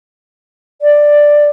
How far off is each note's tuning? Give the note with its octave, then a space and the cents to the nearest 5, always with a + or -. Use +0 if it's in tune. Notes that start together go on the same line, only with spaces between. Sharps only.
D5 +5